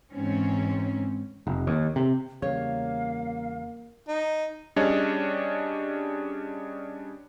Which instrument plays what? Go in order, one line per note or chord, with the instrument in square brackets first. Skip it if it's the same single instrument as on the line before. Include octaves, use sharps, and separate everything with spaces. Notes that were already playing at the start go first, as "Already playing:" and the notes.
[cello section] G#2 E3 C4 C#4
[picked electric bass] F1
D#2
C3
[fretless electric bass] E2 C#3 G3 [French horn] A#3 [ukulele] C#5 [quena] F5
[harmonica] D#4
[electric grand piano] G3 C#4 D4 G#4 C#5 D#5